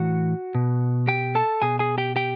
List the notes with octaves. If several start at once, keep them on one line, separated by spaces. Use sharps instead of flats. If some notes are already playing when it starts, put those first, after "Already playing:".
Already playing: A2 E3 F#4 F#5
B2
G4 G5
A4 A5
B2 G#4 G#5
G#4 G#5
G4 G5
G4 G5